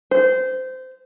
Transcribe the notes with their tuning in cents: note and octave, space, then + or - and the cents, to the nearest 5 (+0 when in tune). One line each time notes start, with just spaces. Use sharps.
C5 -20